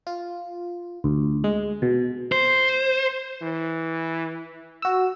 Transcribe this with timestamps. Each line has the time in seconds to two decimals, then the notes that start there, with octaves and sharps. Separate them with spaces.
0.07 F4
1.04 D2
1.44 G#3
1.82 B2
2.32 C5
3.42 E3
4.82 F#4 E6